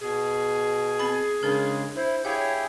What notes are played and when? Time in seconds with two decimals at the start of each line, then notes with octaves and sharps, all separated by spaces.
0.01 B2 G#4
0.99 C4 A5 B5
1.43 C#3 G#3 D4 A#4
1.96 E4 C5
2.25 E4 G4 G#4 C#5 F5